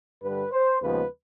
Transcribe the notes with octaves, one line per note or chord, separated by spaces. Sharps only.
G2 D3 G3 B4
C5
D#2 C#3 F3 G#3 B3 B4